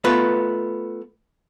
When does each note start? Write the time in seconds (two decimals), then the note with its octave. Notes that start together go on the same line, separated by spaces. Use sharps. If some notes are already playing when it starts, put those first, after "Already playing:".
0.04 A3 B3 F4 B4